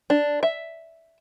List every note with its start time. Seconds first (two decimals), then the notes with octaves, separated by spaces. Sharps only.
0.10 D4
0.43 E5